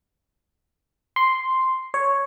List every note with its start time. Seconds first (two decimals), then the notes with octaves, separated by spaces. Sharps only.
1.16 C6
1.94 C#5